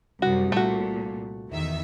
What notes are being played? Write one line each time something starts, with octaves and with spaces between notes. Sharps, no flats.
C2 F#2 F#4
A#2 A3 F#4
E2 D#3 E5